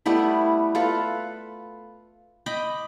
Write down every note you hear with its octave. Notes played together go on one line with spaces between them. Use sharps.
G3 A3 B3 E4
F4 A4 B4
D#5 G5 B5 D6